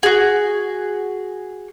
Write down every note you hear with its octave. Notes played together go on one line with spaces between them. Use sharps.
F#4 G#4